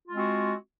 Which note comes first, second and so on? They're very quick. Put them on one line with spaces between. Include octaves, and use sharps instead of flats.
F4 G#3 C4 F#4